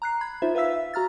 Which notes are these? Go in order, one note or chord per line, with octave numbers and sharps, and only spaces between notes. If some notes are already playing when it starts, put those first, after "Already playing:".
A#5 F#6 C7
B5 G#6
D#4 F4 C5 E5
B4 E5 F5 E6 B6
E5
F#4 A#5 F6 A6